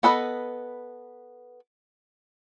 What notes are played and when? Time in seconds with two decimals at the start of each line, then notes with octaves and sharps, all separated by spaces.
0.03 B3 A4 B4 D#5